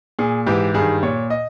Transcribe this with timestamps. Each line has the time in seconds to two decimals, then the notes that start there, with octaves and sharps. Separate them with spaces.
0.19 A#2 G#4
0.46 G#2 E3 G4
0.74 G2 D#3 G#4
1.03 A#2 C#5
1.30 D#5